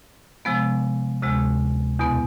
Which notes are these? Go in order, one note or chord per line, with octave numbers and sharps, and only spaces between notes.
C3 F3 G#3 B3
D2 C3 G#3
E2 B2 B3